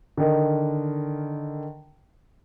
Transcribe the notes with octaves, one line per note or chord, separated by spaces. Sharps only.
D3 D#3 A#4